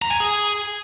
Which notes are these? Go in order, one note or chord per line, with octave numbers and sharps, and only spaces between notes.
A#5
G#5
G#4